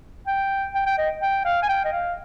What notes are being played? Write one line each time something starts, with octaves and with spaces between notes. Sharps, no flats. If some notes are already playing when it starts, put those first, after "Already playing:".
G5
G5
G5
D#5
G5
F5
G#5
G5
D#5
F5